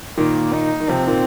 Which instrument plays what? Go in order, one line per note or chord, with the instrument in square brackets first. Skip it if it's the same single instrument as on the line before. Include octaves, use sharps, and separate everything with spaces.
[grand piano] A#2 D#3 [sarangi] A#3
[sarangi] D#4
[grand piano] D#3
[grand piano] C3 F3 [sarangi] C4
[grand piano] A#2 D#3